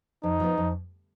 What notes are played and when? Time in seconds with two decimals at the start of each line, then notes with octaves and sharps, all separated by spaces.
0.23 F2 D#4
0.40 F3 B3
0.58 F2